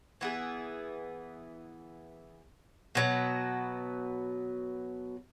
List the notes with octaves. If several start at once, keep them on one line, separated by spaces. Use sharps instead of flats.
E3 B3 G#4
B2 F#3 B3